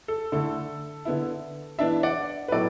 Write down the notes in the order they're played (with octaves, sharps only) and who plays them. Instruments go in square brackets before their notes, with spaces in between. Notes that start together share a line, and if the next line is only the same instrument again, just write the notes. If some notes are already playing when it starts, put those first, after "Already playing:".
[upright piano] A4
D3 A3 E4 A4
D3 B3 E4
E3 B3 D4 E5 A5
D5 F#5
B4
A2 F#3 B3 A4 D5